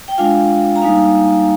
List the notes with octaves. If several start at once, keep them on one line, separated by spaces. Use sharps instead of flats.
G5
G#3 D4 F4 F5 G#5
A#5
G3 A#3 D#4 F5 G#5